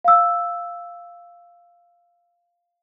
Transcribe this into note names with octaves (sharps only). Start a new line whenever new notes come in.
F5 E6